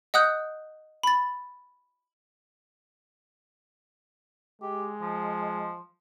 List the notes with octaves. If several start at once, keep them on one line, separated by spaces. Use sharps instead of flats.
D#5 F#5 D#6 F#6 G6
B5 A6
G#3 G4
F3